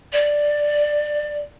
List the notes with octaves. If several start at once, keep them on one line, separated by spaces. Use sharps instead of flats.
D5